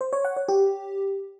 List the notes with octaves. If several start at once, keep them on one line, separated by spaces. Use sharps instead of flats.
C5
C#5
F#5
C#5
G4